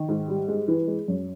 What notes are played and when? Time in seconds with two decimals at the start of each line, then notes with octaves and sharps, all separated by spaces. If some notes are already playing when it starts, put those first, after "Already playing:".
Already playing: D#3
0.09 G#2
0.28 G3
0.48 G#3
0.68 E3
0.88 G#3
1.08 F#2